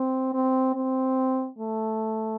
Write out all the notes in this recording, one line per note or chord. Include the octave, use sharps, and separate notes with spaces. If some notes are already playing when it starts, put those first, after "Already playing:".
Already playing: C4
C4
C4
A3